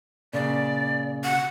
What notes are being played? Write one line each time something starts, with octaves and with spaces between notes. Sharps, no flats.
A#2 C#3 D5
F#5